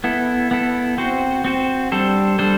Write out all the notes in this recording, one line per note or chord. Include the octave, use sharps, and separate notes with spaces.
B3 E4 A4
B3 E4 A4
C4 F#4 C5
C4 F#4 C5
G3 D4 A4 C5
G3 D4 A4 C5